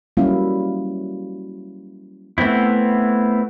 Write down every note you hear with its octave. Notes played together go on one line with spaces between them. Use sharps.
F#3 G3 A#3 C#4 E4 F5
A3 B3 C4 E4